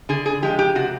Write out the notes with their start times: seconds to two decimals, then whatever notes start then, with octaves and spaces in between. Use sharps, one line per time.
0.09 D3 G#4
0.26 G#4
0.42 F3 G#3 G4
0.59 G4
0.75 C3 F#4